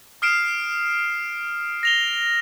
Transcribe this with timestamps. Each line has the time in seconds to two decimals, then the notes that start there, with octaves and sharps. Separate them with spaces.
0.22 D#6 F6 C7 D7 E7
1.83 A#6 F7 G7